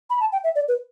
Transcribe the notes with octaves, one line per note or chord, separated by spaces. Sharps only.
B5
A5
G5
E5
D5
B4